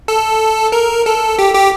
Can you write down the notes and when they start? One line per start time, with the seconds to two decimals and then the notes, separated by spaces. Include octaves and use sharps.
0.08 A4
0.72 A#4
1.06 A4
1.39 G4
1.54 G4